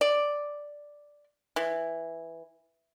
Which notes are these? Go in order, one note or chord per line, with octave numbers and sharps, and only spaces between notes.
D5
E3